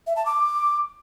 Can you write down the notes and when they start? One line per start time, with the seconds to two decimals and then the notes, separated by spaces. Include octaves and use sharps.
0.07 E5
0.16 A5
0.26 D6